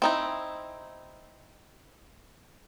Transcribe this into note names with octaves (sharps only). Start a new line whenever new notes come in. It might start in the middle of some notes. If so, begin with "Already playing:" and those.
C4 D#4 E4